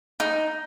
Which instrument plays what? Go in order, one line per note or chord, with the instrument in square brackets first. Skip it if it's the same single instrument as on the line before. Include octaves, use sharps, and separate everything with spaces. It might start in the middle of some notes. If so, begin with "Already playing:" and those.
[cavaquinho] D#4